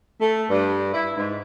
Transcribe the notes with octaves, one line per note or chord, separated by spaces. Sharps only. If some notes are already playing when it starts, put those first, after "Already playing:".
A3
G2
E4
G#2